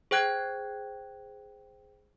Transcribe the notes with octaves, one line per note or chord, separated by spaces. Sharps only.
G#4 C5 G5 F#6 G#6